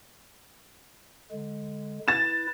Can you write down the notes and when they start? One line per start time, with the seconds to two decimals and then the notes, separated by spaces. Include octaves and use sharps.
1.32 D3 G#3
2.08 E4 B4 A6 E7